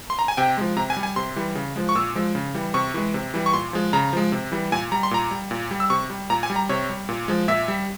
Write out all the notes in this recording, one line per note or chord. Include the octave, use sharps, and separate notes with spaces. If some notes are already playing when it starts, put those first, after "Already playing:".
C6
A#5
G#5
C3 G5
F3 G#3
C3 A#5
G#5
G3
G#5
C3 C6
E3 G3
C#3
F3 G#3
C#6
A#2 E6
F3 G#3
C#3
E3 G3
C3 C#6
E3 G#3
C3
E3 G3
C#6
A#2 C6
F3 G#3
C#3 A#5
F3 G#3
C3
E3 G3
A#2 G#5
G3 A#5
C6
A#2 A#5
G3
A#2
G3
E6
C3 C#6
G3
A#2 A#5
G#5
G3
A#5
C3 C#5
G3
A#2
F3 G#3
A#2 E5
G3